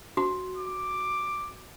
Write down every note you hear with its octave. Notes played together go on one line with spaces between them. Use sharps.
F#4
D6